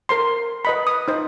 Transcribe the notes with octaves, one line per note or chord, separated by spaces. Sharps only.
A#4 C5 C6
B4 D#5 B5
D#6
D#4 C5